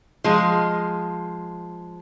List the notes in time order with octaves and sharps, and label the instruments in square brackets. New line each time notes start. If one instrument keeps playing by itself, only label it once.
[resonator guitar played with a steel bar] F3 G#3